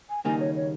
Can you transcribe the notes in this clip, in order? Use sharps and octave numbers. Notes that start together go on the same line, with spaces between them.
G#5
D#2 C#3 G3 A#3 D#4 G#5
C#5
C#5